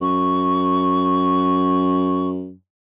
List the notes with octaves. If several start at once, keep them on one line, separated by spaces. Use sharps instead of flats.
F#2 C#6